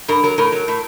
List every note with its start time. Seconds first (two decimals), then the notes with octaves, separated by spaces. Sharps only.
0.08 G2 A#4
0.23 F#3 A#4
0.38 A2 A#4
0.52 F#3
0.68 A2